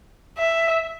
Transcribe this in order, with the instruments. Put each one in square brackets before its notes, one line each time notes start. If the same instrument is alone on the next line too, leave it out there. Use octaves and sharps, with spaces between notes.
[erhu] E5